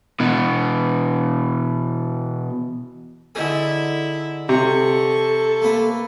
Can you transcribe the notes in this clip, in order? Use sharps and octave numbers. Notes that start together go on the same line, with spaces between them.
B2 E3
D3 D#4 E4 G#4
C3 A4 C#6
A3 A#3 B4